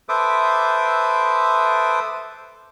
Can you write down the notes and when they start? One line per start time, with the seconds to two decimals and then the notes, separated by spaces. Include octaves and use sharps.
0.09 A4 B4 C5 E5 D6 D#6